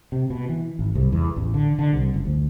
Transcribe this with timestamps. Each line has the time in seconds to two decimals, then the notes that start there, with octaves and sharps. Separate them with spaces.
0.12 C3
0.30 B2
0.49 E3
0.79 G#1
0.95 C2
1.12 E2
1.36 A1
1.54 D3
1.79 D3
1.93 C2
2.14 F#1
2.26 D2